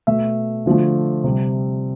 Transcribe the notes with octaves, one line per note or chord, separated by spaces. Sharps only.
B2 A3 E5
D3 F3 A3
C3 G3